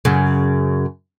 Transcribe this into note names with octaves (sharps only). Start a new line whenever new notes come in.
F#2 C#3